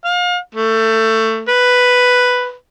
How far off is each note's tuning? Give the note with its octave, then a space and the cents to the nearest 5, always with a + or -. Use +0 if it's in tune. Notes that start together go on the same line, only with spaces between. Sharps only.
F5 +35
A3 +20
B4 +5